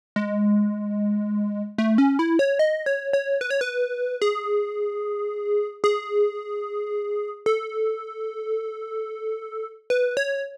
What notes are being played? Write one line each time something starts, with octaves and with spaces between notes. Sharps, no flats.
G#3
A3
C#4
E4
C#5
D#5
C#5
C#5
B4
C#5
B4
G#4
G#4
A4
B4
C#5